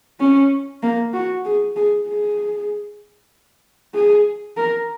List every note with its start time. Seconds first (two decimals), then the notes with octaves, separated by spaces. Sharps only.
0.20 C#4
0.82 A#3
1.14 F#4
1.45 G#4
1.76 G#4
2.07 G#4
3.94 G#4
4.56 A#4